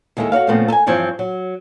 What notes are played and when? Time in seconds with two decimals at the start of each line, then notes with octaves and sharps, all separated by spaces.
0.17 D#2 D#3 G#3 E4 A4
0.32 F#4 G4 C#5 F5
0.47 A#2 C#3 F3 A3 B3 C4
0.68 A4 G#5
0.86 G2 E3 F3 C4 C#5
1.19 F#3